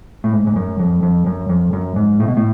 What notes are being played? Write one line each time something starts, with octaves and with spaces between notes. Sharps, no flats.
A2
G#2
G#2
F#2
F2
F2
F#2
F2
F#2
G#2
A2
B2
A2